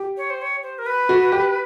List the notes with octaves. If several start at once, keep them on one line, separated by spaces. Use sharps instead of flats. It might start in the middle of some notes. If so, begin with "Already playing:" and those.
Already playing: G4
C#5
C5
C#5
C5
A#4
B4
F#4
G4